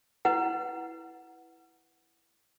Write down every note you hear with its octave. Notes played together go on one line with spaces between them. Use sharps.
E4 B4 F#5